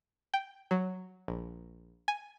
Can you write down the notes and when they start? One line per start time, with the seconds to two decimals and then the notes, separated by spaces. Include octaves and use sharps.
0.34 G5
0.71 F#3
1.28 A#1
2.08 G#5